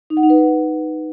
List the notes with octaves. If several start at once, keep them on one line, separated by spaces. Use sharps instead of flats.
D#4
F#5
D#4
B4